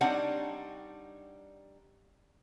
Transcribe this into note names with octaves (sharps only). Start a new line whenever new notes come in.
G3 C4 D4 D#4 C#5 F#5